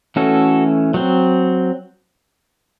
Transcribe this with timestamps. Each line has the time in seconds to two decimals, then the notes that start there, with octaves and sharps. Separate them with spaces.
0.16 E3 A3 C#4 F#4 A4
0.94 F#3 C4